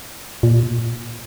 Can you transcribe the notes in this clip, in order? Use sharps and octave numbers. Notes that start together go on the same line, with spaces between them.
A#2